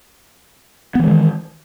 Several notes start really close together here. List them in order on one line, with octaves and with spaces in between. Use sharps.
B3 E3 G#3 D#3